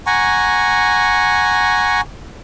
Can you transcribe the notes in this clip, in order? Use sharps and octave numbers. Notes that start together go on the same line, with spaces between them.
F#5 G#5 A#5 C#6